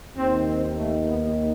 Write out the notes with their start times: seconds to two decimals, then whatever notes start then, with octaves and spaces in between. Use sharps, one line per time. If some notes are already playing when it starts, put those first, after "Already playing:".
0.17 D#2 C4
0.22 D#3
0.47 C4
0.77 A3
1.07 B3